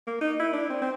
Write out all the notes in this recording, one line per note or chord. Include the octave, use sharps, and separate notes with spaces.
A#3
D#4
E4
D4
C4
C4